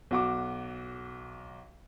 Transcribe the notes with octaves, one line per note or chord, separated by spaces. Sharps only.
B1 F#4 D6